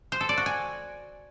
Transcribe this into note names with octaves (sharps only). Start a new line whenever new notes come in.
C5
A4
D5
F#4
G#5